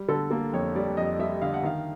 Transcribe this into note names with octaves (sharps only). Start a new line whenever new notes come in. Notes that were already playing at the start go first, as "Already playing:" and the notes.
Already playing: G3
D3 A4
A#3 A4
F2 C#5
G3 D5
F2 D#5
G3 E5
D3 F5
F#5
D#3 F5